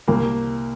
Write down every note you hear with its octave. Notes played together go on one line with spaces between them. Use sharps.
C2 A#3